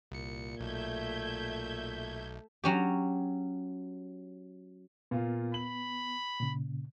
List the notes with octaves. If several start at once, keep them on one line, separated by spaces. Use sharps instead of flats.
C2 A#2 C#7
B1 A3 E5 G6 G#6
F#3 C#4 G4
A#2 B3 F4
B5 F#7
A#2 C#3